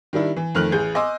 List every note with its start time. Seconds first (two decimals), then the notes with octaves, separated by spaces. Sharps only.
0.13 D#3 G3 D4 E4
0.37 E3
0.55 F2 D#3 A3 F6 F#6 F#7
0.72 A1 G#4 G6
0.95 D#5 G#5 C6 D6 E6